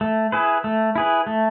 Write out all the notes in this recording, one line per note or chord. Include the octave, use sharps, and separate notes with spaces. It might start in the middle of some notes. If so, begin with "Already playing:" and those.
A3
E4 G#4 B4
A3
E4 G#4 B4
A3